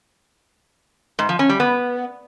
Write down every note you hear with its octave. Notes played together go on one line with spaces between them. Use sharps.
G#2
F3
C#4
G3
B3